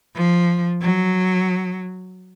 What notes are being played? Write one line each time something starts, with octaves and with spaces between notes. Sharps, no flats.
F3
F#3